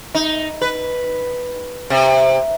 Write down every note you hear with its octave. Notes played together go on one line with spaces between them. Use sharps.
D#4
B4
C3